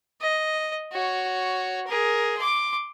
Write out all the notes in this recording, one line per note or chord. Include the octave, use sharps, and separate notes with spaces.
D#5
F#4 C#5
G#4 A#4
C6 D6